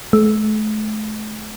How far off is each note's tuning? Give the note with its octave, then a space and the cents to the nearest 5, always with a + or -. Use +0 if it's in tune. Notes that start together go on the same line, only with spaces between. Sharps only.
A3 -40